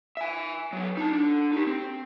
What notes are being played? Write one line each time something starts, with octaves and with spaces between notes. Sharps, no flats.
E5 G#5
F#3 B3
D#4 A5
D3 D4
D#4 G4
C4